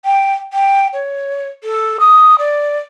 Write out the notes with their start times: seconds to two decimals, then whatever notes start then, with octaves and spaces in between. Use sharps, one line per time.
0.05 G5
0.53 G5
0.93 C#5
1.64 A4
2.00 D#6
2.39 D5